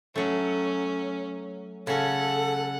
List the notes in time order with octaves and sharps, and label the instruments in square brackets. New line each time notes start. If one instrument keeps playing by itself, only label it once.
[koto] F#3 A3 [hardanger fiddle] C#4
[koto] C#3 C#4 [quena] A4 [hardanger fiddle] F#5